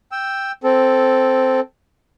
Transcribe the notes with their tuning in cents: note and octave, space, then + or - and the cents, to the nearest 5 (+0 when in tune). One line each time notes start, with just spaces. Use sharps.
G5 +0 E6 +0
C4 +0 A4 -5